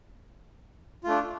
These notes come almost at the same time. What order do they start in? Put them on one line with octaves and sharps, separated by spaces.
F4 A3 D4